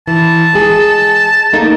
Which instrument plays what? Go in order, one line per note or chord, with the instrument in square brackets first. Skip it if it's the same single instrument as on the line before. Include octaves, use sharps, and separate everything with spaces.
[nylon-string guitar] E3 [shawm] A5
[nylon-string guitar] G#3 G#4
A3 A#3 D#4